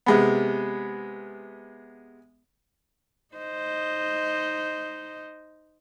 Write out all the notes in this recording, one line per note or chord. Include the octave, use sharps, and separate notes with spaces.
C3 G#3 B3
D#4 C5 D#5